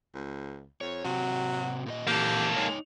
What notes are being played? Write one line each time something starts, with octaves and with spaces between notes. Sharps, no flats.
C#2
F2 C#5
C3 F#3 C4 F#4
A#2 A#4 D#5
A#2 E3 A#3 G4 A4
G#3 D#4 C#5